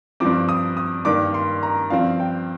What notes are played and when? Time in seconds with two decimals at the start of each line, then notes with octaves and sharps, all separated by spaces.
0.20 G2 F3 C4 D6
0.49 D#6
0.77 D#6
1.05 G2 D#3 A#3 D4 D6
1.34 C6
1.63 A#5
1.90 G2 F3 C4 F5
2.20 G5